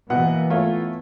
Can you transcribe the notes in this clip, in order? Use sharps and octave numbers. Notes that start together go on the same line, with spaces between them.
B2 E3 A#3 B3 F#5
A3 F4 C#5